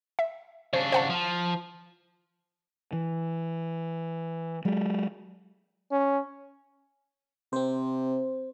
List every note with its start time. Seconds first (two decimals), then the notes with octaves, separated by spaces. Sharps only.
0.19 E5
0.73 C#3 D4 C5
0.92 C5 F#5 A5
1.10 F3
2.93 E3
4.65 F#3 G#3
5.91 C#4
7.53 C3 C4 C5